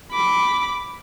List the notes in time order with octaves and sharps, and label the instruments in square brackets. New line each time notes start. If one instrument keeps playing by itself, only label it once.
[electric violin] B5 D6